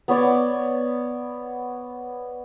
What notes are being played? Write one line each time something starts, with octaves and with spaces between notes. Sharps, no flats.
B3 C#5 D5